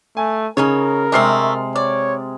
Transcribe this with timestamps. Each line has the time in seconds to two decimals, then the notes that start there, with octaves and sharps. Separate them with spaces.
0.17 A3 G#5
0.57 C#3 C#4 D#4 A#4 C#5
1.12 C3 G#3 A3 C4 D4 F6 C7
1.76 C#5 D5